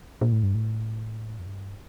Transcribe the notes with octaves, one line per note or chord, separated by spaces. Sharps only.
A#2
A2
G2
A2
F2
G2